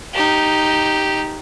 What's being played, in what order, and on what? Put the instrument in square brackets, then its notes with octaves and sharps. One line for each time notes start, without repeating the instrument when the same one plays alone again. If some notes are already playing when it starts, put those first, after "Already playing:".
[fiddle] D#4 G4